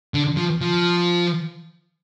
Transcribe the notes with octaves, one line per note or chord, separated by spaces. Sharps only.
D3
F3
F3